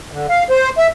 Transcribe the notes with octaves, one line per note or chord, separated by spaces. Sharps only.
D3
F5
C5
E5